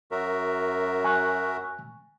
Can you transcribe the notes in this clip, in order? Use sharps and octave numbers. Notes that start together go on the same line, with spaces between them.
F#2 F#4 A#4 E5
G#5 C#6 F#6